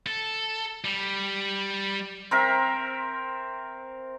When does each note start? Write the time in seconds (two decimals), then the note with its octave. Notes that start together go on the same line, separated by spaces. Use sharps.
0.07 A4
0.85 G3
2.31 C4 A#4 E5